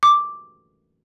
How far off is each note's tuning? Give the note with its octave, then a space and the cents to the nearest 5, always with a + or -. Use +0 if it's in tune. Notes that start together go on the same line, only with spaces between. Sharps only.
D6 +0